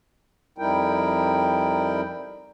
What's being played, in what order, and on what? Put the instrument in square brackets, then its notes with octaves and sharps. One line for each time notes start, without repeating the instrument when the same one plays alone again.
[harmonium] F2 G3 D#4 E4 A#4 G5